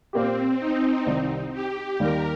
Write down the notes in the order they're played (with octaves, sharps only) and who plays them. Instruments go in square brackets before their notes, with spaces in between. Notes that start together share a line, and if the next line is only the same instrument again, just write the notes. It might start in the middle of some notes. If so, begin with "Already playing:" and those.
[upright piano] A#2 A#3 G4 [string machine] C4
[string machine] D#4
[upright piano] C2 C3 D#3 G3
[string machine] G4
[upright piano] D#2 D#3 G3 [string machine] A#4